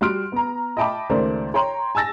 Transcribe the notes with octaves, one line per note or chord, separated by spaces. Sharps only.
G3 F#4 C6 F6 D7
B3 A#5
D#5 E5 G5 A5 B5 D6
C#2 D#3 A3 A#4 C5 D5
C#5 G5 A#5 C6
G#5 A5 E6 A6 A#6